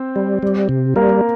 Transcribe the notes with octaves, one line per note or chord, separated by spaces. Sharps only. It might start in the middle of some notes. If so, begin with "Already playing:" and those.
Already playing: C4 C5
G3
G3
C3
G3 A#3 A#4